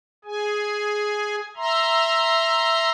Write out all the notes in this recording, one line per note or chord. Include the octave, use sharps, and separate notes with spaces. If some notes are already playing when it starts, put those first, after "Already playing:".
G#4 G#5
E5 A#5 C6